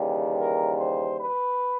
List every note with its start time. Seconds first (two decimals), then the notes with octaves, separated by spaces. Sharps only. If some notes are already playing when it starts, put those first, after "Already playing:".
Already playing: D#2 C#3 E3 G3
0.37 A#4
0.77 C5
1.17 B4